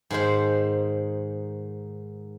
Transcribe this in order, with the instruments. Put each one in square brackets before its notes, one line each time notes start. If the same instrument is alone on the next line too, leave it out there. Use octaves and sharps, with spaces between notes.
[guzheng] G#2 D#3 C5